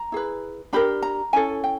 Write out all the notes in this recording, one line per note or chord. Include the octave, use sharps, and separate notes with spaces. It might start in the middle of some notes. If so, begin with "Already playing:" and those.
Already playing: A#5
E4 G#4 B4
D4 G4 A#4 B5
A#5
C#4 E4 A4 G#5
G5